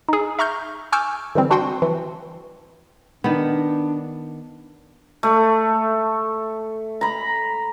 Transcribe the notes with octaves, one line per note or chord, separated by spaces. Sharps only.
D#4 G#4
E5 A#5 C#6 F6 G6
G#5 C#6 D6 E6 F6 G6
D3 E3 G3 C4
D4 F#4 F#5 G5 C6
E3
D#3 B3 D4
A3
A#5 B5